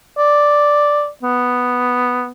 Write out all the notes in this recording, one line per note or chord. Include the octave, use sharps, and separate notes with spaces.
D5
B3